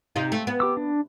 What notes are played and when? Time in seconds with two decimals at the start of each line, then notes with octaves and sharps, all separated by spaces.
0.16 C3 D#4 F4
0.32 A3
0.47 B3
0.60 G4 D6 E6
0.77 D4